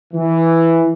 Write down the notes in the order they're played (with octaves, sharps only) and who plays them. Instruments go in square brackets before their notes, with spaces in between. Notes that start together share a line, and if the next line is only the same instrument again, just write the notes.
[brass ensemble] E3